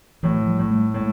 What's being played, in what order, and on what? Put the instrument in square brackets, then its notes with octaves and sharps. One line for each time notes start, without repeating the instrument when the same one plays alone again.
[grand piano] A2 [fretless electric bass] E3 F#3
[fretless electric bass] F3 G3
[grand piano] A2
[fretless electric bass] G3 A3
[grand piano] A2 [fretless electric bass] G#3 A#3